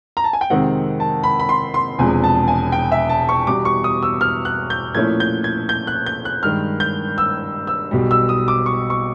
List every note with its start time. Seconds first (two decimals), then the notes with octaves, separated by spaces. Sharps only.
0.17 A#5
0.24 A5
0.33 G#5
0.41 G5
0.50 F2 C3 D#3 G#3 C4 F#5
1.00 A5
1.24 B5
1.40 B5
1.49 C6
1.74 C6
1.98 E1 E2 C3 F3 G#3 G#5
2.24 A5
2.48 G#5
2.72 G5
2.92 E5
3.09 A5
3.29 C#6
3.47 E2 B2 G3 D6
3.65 C#6
3.84 D#6
4.02 E6
4.21 F6
4.45 F#6
4.70 G6
4.95 A#2 F3 A3 C#4 E4 G#6
5.20 G6
5.44 G#6
5.69 G6
5.87 F#6
6.06 G6
6.25 F#6
6.43 G2 D#3 G#3 F6
6.80 G6
7.18 E6
7.67 E6
7.91 B1 B2 G3
8.11 E6
8.29 D#6
8.48 D6
8.66 C#6
8.90 C#6